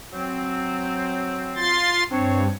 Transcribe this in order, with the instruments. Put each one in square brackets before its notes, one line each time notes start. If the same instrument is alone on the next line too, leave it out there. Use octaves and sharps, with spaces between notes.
[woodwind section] F#3 C4
[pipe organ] F4 C6 A6
[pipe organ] G2 [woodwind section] C4 D4 C#5